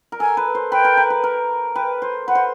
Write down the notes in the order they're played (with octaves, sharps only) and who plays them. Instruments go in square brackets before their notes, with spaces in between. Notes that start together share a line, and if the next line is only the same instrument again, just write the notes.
[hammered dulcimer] A#4
[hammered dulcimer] A4 [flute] G#5
[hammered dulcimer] B4
C5
[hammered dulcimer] B4 [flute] G5
[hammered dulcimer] A#4
B4
B4
A#4
[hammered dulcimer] B4 [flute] G5
[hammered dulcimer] C5
[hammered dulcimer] B4 [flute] F#5
[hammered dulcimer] C5